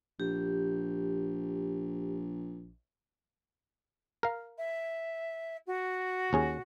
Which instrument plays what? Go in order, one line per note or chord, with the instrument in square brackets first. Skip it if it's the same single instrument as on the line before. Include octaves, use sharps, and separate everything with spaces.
[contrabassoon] A#1 [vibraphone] G4
[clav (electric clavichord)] A#4 F5
[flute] E5
F#4
[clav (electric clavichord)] D#2 C#4 G#4